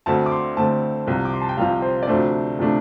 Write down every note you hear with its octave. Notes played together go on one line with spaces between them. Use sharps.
D2 D3 A3 C4 A5
D6
C6
D2 D3 A3 C4 A5
C2 C3 F3
D6
C6
A5
G5
C2 C3 F3 F5
C5
D5
D2 C3 F3 A3 D4 C5
C3 F3 A3 D4